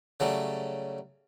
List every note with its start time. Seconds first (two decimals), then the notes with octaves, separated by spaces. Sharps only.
0.20 C#3 F#3 G3 A3